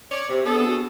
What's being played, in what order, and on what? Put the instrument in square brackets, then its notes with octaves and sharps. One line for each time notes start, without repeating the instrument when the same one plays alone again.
[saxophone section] C#5 D5
C3
[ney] B3 [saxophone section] D4 G#4 A4
[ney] F#4